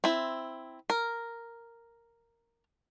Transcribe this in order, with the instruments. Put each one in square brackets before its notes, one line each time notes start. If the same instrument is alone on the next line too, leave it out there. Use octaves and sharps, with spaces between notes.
[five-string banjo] C4 E4
A#4